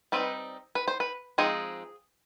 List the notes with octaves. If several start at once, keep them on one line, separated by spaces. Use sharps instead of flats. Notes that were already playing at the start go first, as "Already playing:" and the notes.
G3 C4 D#4 B4
B4
C5
B4
F3 G#3 C4 D#4 G#4